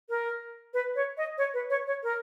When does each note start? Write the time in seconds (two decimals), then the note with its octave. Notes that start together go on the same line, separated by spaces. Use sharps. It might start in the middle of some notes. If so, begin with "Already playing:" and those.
0.10 A#4
0.74 B4
0.96 C#5
1.17 D#5
1.38 C#5
1.54 B4
1.70 C#5
1.87 C#5
2.03 A#4